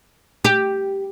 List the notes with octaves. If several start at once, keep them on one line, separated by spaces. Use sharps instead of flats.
G4